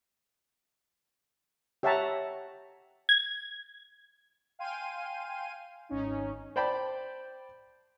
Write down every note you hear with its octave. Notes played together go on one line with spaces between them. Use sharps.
G4 C#5 E5 F#5 A5 A#5
G#6
F5 G5 G#5 C6 D#7
G#1 C#4 D#4
C5 D5 G5 A5 B5